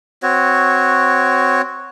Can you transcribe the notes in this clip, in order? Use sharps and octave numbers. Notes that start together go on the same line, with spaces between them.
C4 F#4 C#5